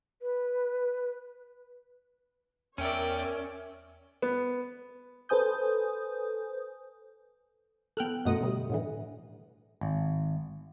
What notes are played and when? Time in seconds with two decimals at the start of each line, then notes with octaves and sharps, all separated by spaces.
0.22 B4
2.78 E2 C#4 A#4 C#5 D5 E5 G5
4.22 B3
5.29 A4 B4 C5 G#5 D#6 G6
7.97 B3 A4 G5 F6 F#6
8.25 F#2 B2 A3 D#5 F#5 D#6
8.41 B2 D3 G3
8.70 A2 D3 E3
9.81 G#1